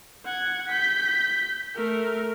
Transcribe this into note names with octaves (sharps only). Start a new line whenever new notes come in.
F#5 G#6
G6 B6
A3 A#4